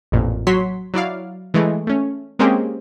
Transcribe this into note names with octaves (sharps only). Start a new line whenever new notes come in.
A1 F2 A#2
F#3 F#4 C#5 C6 B6
F#3 E4 D5 F5
E3 G#3 A3
A3 C#4
G#3 A#3 C4 C#4 G4 G#4